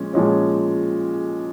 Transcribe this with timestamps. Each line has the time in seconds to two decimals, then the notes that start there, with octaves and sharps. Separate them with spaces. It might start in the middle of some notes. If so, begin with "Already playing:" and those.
Already playing: A#2 F3 G#3 C#4
0.13 A#2 F3 G#3 C#4